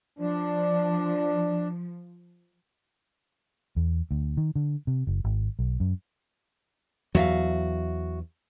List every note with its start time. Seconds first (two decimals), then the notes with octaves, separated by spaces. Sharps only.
0.19 F3 D4
3.76 E2
4.11 D2
4.37 D#3
4.55 D3
4.87 C3
5.07 F#1
5.24 G#1
5.59 B1
5.80 F#2
7.15 E2 F#3 F#4 E5 F5